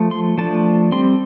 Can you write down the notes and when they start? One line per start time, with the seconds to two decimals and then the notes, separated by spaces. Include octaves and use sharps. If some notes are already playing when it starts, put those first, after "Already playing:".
Already playing: F3 A3
0.11 C6
0.38 F3 A3 D4 A5
0.92 G3 C4 C6